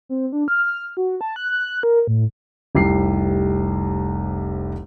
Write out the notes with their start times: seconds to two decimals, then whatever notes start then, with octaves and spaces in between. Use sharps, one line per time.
0.09 C4
0.32 D4
0.48 F6
0.97 F#4
1.21 A5
1.36 F#6
1.49 F#6
1.83 A#4
2.07 A2
2.75 F1 C2 G4 C7